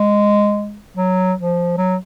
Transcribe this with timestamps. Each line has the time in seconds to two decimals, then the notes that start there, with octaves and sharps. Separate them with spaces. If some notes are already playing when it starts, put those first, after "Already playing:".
Already playing: G#3
0.97 F#3
1.38 F3
1.78 F#3